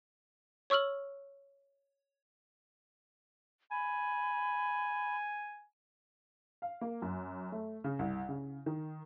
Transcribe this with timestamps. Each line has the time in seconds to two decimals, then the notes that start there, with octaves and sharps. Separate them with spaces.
0.70 C#5 C#6 E6 F6 F#7
3.71 G#5 B5
6.62 F5
6.81 A#3
7.02 F#2
7.52 A3
7.84 C#3
7.99 C2
8.29 C#3
8.66 D#3